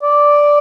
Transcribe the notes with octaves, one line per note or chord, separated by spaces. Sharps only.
D5